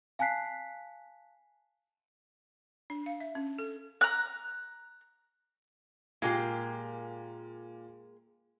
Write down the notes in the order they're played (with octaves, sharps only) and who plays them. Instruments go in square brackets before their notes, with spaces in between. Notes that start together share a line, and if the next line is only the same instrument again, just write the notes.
[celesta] F5 G#5 A5 F#6 B6 C7
[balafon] D4
F5
E5
C#4
A4
[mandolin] A#5 F#6
[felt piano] A#2 [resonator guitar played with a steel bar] G#3 A#3 G4